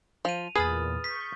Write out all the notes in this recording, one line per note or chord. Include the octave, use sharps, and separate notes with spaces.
F3 D#7 F7
E2 A#2 G#4 B4 D#6 F6 A6
C#6 G6 B6